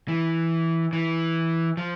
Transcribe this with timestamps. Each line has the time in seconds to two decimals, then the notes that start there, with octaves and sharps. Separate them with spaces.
0.08 E3
0.93 E3
1.77 F3